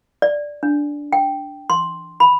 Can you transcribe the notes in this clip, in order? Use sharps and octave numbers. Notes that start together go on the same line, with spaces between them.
D5
D4
G5
C6
B5